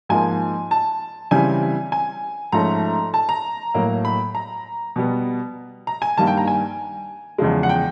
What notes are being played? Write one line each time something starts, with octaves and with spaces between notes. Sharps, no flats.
G#2 F3 A#3 G#5
A5
C#3 E3 G3 C4 G#5
G#5
G#2 F3 A3 C#4 A#5
A5
A#5
A2 F#3 A#3
B5
A#5
B2 G3 B3
A#5
G#5
G2 D#3 G3 A#3 A5
G5
A#5
G#5
E2 C#3 F3 G#3
F#5
G5